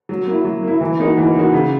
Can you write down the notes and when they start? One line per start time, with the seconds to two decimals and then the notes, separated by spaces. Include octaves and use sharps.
0.09 F#3
0.27 A#3 E4
0.45 F#3
0.63 A#3 E4
0.81 E3
0.99 A#3 D#4 F#4
1.17 E3
1.35 A#3 D#4 F#4
1.52 C#3